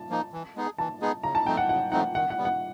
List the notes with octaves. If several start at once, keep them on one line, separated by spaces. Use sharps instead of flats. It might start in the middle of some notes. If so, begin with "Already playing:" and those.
Already playing: A5
F3 A#3 D#4
E3
G#3 B3 D#4 G#4
E3 A5
G#3 B3 D#4 G#4
C#3 A#5
A5
F3 A3 C4 D#4 G5
F#5
C#3 F#5
F3 A3 C4 D#4 F#5
D#3 F#5
F#5
G3 B3
F#5